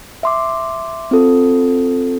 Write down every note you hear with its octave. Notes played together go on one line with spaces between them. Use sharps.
E5 C6 D6
C4 F4 A4